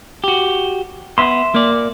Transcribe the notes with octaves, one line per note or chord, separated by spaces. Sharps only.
F#4 G4
B3 E5 C6
A#3 D5